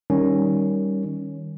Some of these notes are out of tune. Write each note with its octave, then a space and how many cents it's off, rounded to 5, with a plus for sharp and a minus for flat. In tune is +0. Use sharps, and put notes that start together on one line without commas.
D#3 +0 G3 +0 C#4 +0